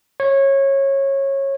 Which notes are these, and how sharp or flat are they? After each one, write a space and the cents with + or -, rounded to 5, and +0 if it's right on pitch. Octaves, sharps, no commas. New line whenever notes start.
C#5 -20